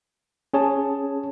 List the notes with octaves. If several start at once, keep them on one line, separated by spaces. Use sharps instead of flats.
C#4 G#4 C#5 A5